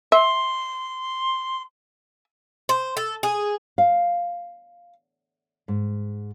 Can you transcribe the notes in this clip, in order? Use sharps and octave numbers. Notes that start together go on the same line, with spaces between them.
E5 C6
C5
A4
G#4
F5
G#2